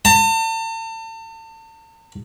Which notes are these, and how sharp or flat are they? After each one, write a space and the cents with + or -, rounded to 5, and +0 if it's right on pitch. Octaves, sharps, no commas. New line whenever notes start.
A5 +40